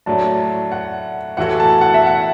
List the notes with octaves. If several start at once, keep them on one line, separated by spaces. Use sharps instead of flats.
A2 F#3 D4 A5
F#5
A2 E3 A3 F#4 A4 F#5
A5
F#5
E5
F#5